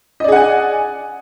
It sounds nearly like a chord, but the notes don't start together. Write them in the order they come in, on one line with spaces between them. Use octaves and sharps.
D#5 D5 G#4 F#5 G#5